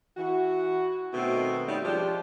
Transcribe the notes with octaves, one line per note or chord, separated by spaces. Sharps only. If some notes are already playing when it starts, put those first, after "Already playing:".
E3 F#4
B2 D#3 A3 B3 C4
G3 A3 C#4 D#4
F3 G#3 D4 F4 G4